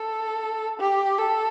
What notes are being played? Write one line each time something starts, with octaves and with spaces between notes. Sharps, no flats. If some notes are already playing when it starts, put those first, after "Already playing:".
Already playing: A4
G4
A4